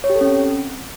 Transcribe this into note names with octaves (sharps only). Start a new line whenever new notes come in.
C#5
G4
A4
C#4
C4